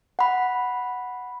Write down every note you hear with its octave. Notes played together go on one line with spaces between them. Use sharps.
F#5 B5